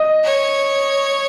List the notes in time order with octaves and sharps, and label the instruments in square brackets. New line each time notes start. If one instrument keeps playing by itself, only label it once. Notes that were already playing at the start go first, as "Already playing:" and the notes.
Already playing: [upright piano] D#5
[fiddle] C#5